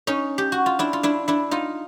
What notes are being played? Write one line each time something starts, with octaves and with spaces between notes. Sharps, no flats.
C#4 D#4
G4
F#4
F4
D4 E4
F4
D4 E4
D4 E4
D#4 F4